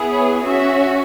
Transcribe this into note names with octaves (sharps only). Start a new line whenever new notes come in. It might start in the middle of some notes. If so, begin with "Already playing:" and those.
Already playing: B3 E4 G#4
C#5
C#4 F#4 E5